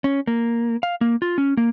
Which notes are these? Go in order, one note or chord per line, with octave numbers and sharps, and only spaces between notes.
C#4
A#3
F5
A#3
F4
C#4
A#3